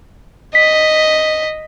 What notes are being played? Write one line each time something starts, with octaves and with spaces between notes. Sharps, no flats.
D#5 B6